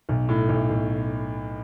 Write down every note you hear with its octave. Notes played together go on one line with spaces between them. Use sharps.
B1
A2
B1
B1